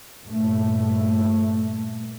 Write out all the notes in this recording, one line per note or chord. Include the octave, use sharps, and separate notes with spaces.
G2 A#2 A3